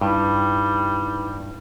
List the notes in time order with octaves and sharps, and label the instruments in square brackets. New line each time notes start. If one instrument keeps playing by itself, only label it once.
[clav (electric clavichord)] G2 [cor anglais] G3 [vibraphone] D#4 E4 B4